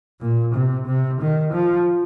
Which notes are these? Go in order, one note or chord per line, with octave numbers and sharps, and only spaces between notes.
A#2
C3
C3
D#3
F3